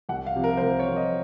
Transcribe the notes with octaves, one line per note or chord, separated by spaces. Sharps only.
C2 F#5
F5
C3 F3
A#4
C5
C2 A#4
C#5
C3 F3
D#5